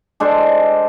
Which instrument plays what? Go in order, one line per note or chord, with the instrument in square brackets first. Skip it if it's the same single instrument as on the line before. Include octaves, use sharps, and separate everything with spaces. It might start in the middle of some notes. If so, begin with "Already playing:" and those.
[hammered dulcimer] G#3 D4 A4 C5